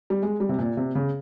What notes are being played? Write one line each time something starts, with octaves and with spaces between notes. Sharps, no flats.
G3
G#3
G3
C3
A#2
C3
C#3